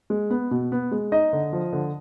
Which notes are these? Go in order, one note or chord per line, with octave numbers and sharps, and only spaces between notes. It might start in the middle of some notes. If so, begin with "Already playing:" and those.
G#3
B3
B2
B3
G#3
D#4 D#5
D3
F3
D3